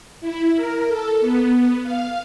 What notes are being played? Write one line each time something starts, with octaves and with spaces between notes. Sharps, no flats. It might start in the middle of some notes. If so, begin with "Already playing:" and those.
E4
A#4
A4
B3
F5